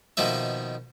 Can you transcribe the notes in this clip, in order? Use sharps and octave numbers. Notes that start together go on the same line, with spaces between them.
B2 D#3 F3 A#3 E5